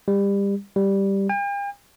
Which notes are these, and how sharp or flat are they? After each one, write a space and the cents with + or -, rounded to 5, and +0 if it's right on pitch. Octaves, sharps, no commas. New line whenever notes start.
G3 +25
G3 +0
G5 +45